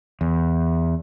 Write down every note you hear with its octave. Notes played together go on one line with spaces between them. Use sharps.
E2